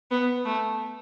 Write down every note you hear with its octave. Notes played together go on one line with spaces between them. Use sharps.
B3
A3